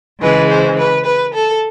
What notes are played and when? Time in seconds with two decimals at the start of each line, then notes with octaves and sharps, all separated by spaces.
0.21 C#3 E3 G#3 B4
0.49 C5
0.77 B4
1.05 B4
1.33 A4